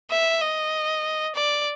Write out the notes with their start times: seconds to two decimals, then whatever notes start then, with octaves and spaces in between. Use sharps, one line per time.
0.11 E5
0.42 D#5
1.36 D5